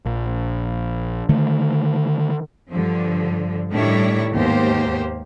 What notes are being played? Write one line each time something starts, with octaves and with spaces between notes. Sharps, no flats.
A#1
D3 D#3 A3
G2 D3 F3
A2 D#3 G3 D4 E4 C#5
D#2 G#2 A#3 B3 G4 C5